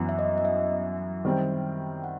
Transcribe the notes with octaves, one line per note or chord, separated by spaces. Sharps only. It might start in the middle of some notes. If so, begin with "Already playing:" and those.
Already playing: F#2 E3 B3
E5
D#5
D#5
E5
D#3 G3 C4
F#5